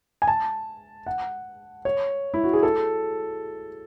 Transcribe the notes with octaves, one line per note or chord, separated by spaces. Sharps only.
G#5
A5
F#5
C#5
E4
F#4
G#4
A4